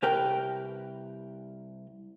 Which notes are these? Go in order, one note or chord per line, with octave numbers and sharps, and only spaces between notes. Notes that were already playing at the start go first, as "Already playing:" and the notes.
C2 G4 A#4 B4 G5